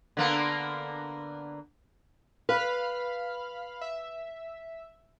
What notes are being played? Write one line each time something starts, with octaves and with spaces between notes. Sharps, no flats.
D3 A#3 B3
B4 F5 B5 F6
E5